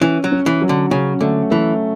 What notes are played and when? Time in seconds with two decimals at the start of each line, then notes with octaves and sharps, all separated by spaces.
0.01 E3 C#4
0.24 F#3
0.32 C#4
0.46 E3
0.61 F#3
0.69 D3
0.91 C#3 C#4
1.21 D3 A3
1.51 E3 A3